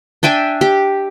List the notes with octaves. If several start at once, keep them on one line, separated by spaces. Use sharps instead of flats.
D4 E5 G5 G#5
G4